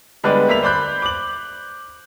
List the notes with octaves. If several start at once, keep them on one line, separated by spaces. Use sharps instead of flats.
D3 G3 G#3 B3 B4 D5
A#3 E5 B5 B6 F7
C5 D5 B5 F#6 G6
D6 F#7